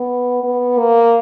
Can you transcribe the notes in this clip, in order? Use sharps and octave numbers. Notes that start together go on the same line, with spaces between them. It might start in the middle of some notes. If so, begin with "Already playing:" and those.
Already playing: B3
B3
A#3